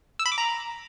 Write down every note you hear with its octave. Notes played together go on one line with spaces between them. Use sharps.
E6
B5
D6
A#5